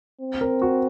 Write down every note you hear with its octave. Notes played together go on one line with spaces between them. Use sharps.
C4
A#4
F#4